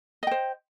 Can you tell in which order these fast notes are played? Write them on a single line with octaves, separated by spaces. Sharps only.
D#5 G5 C5